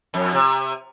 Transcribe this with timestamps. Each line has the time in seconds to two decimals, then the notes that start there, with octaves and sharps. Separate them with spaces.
0.14 F2
0.33 C3